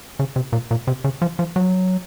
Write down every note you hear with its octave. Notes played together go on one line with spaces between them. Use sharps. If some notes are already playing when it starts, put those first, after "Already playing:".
C#3
C3
A#2
A#2
C3
C#3
F3
F3
F#3